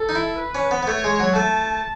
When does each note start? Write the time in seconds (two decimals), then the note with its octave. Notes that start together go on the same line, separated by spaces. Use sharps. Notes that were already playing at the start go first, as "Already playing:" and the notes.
Already playing: A4
0.09 D#4
0.15 E4
0.39 B4
0.55 C#4
0.71 B3
0.83 B3
0.87 A3 C#5
1.04 G#3
1.19 F#3
1.35 A3 A5